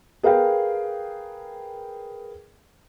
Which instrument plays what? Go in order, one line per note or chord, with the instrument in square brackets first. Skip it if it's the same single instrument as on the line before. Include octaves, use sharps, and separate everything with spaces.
[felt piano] G#4 A#4 B4 F5 G5